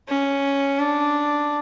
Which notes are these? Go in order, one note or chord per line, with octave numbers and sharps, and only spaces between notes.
C#4
D4